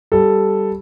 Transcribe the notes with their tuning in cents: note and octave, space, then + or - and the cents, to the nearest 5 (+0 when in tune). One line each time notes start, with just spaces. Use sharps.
G3 +0 A4 +0